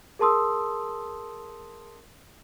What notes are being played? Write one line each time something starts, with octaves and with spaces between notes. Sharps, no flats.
G#4 A#4 A5 C6 D#6 E6